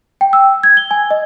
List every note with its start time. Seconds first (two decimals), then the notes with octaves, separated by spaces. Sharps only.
0.21 G5
0.33 E6
0.63 G#6
0.77 G7
0.91 G#5
1.11 D#5